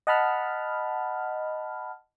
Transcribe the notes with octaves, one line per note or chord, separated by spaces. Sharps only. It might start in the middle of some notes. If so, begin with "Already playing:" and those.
D#5 F#5 A5 B5 F6